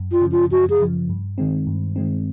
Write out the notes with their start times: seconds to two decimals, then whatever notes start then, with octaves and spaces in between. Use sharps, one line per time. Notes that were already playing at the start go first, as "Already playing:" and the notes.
Already playing: F#2
0.12 F4
0.22 C#3 F3
0.32 F4
0.51 F#2 F#4
0.70 G#4
0.80 C#3 F3
1.09 G2
1.38 D#3 G#3 C4
1.67 G2
1.96 D#3 G#3 C4